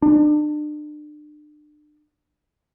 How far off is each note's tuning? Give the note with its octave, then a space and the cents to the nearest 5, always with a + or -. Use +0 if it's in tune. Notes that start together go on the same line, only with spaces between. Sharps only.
D4 +35